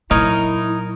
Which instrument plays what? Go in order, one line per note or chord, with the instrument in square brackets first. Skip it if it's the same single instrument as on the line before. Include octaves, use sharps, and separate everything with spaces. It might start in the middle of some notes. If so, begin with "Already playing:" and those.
[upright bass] A#2 F#3 [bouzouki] D#4 [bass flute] E4 [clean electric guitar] A#4 C#5